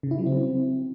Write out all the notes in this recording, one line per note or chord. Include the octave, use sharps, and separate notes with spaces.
C#3
E4
F#3
C4